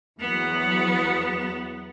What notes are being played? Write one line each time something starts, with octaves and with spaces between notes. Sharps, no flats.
E2 F#3 B3